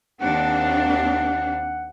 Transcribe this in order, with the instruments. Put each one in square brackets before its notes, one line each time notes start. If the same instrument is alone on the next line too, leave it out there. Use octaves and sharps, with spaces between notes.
[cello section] D#2 C4 D4 [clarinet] F#5